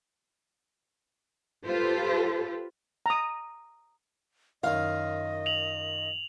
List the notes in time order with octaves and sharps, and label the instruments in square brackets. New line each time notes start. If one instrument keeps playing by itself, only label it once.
[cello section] F4 G4 A4 B4 C5
[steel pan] A#5 D#6
[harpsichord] F#2 D#3 F4 [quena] D#5 [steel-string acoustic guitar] F5
[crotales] F7 F#7